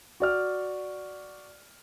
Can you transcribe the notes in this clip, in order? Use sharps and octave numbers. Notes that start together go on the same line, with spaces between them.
F#4 D5 F6